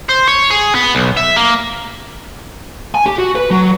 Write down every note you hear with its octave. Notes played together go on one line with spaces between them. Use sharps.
C5
C#5
G#4
B3
B1
E5
A#3
G#5
G4
F#4
B4
F#3